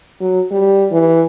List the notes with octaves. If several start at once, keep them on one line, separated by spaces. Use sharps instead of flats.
F#3
G3
E3